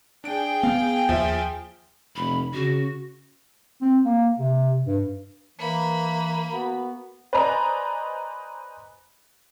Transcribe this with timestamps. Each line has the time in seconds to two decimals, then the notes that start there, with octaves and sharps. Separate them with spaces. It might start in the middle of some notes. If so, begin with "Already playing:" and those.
0.24 D4 G#4 G5 D7
0.63 B3 F5
1.09 D#2 F3 E5
2.16 F1 B5
2.53 C#3 F#4
3.81 C4
4.05 A#3
4.38 C3
4.86 G2
5.59 E3 A#3 B5
6.52 B3 F#4
7.33 B4 C5 D5 D#5 G#5 A#5